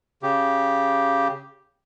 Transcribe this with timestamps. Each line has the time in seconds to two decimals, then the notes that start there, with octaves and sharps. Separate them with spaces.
0.23 C#3 G4